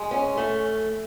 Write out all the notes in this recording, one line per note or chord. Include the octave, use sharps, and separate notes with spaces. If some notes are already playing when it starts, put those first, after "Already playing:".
Already playing: G#3
C#4
A3